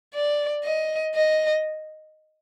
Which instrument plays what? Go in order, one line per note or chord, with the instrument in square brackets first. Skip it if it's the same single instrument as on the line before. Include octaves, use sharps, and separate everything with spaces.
[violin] D5
D#5
D#5